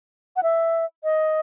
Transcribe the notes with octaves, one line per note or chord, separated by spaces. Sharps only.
F#5
E5
D#5